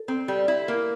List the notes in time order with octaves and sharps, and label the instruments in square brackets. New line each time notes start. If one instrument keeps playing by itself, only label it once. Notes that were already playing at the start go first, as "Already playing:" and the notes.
Already playing: [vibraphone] A4
[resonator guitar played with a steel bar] C4
G3
E4
[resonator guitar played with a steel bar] A#3 [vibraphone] A#4